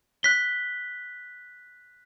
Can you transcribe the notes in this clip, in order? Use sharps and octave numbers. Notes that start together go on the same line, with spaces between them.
F#6 B6 G7